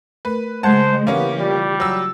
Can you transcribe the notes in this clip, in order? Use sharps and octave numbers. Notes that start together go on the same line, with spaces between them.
A3 A#4 B4
C#3 G#3 A3 C5 F#5 A5 G#6
E3 A#3 B3 C#4 G4 E5
G3 F4 D5
F#3 E6